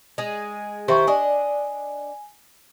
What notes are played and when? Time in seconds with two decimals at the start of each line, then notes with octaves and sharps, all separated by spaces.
0.18 G#3 G#4
0.88 D#3 E4 G4 C5 E5 C#6
1.07 D4 D#5 G#5